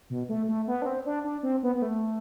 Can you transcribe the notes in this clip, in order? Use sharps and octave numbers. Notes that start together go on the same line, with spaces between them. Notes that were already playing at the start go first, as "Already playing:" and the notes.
B2
A3
A3
B3
D4
C4
D4
D4
C4
B3
B3
A3